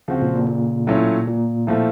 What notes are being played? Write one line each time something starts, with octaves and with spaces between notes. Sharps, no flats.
C#3 F3 C4 F#4
A#2
A#2
A#2
A2 F#3 A3 C#4 F4
A#2
A2 F3 A3